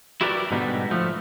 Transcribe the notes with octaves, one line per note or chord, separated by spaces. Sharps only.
E4 F#4 G4 A#4 B4 D5
G#2 B2 D3 G3 B3 D#4
F3 A3